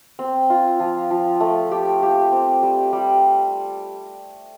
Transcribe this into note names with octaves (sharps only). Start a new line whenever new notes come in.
C4
F4
F3
F3
A3
G4
G4
C4
G3
G3